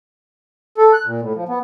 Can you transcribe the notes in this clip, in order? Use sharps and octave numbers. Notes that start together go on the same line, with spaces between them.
A4
F#6
A#2
A2
F3
B3